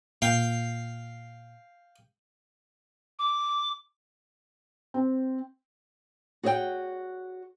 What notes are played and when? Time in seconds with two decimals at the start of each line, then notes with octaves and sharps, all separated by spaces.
0.22 A#2 F5 G5
3.19 D6
4.94 C4
6.43 F#4 G#4 C#5 D#5 G5